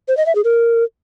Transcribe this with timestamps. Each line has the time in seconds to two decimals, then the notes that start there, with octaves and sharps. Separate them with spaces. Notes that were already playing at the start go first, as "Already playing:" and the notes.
0.08 C5
0.17 D#5
0.26 E5
0.35 G#4
0.44 A#4